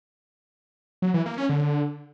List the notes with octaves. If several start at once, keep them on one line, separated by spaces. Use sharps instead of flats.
F#3
E3
A#3
C#4
D3